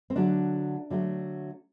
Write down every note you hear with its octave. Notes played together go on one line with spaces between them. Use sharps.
C4
D3 F#3 A3 D4
D3 F#3 A3